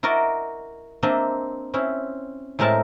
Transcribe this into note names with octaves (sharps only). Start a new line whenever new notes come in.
E4 F#4 A#4 D5 D#5
A#3 C4 D4 D#5 E5
C4 C#4 E4
A2 G#3 C4 A#4 E5 A5